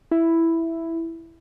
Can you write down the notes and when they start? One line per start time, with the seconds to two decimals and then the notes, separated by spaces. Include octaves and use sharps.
0.11 E4